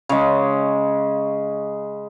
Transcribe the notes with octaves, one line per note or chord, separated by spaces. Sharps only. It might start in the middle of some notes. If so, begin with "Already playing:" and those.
C#3 G#3